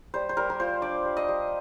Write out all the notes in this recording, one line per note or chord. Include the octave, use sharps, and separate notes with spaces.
G3 C5
C5
G3 A#4
A#4
F4 C5
D4 D5
G3
D#5
G3